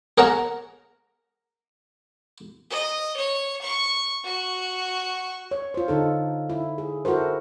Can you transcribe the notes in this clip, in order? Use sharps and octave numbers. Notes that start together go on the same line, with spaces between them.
G#4 A#4 C#5 F#5 A5 A#5
D#5
C#5
C#6
F#4 C#6
C#5
F4 C5
D3 D#4 A4
E4
G#4
E4 F#4 A4 A#4 C5